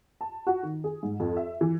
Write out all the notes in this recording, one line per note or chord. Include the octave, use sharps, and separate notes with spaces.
A5
F#4
D#3
G#4
G#2
F2
E5
E3